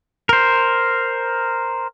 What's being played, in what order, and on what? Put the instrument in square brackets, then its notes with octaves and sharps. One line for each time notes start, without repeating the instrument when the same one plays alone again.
[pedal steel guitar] A#4 C5